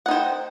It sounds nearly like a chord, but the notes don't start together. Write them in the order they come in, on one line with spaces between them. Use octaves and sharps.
F#5 D#4 C5 G5